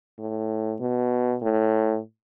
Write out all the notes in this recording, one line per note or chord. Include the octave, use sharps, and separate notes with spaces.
A2
B2
A2